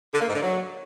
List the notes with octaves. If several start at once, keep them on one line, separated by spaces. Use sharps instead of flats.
D3
A#3
G#2
D3
F#3